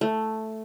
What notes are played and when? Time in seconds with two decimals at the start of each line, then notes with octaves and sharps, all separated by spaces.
0.01 A3